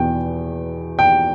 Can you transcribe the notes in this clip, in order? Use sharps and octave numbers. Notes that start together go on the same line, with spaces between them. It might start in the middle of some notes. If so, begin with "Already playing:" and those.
Already playing: E2 B2 G5
G5